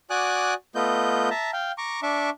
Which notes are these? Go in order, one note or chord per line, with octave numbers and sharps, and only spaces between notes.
F#4 D5 G#5 D6 D#6 F#6
A3 B3 F4 D#5 G6
E5 A5 A#5
F5 G5
A#5 C#6 D6
D4 E5 C#6 D6